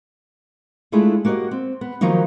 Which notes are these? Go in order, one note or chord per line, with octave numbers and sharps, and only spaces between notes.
G#3 A3 D4 E4 F4 G#4
A#3 F#4 G4 C#5 D#5
C4
B3
D#3 F3 F#3 A#3 D#4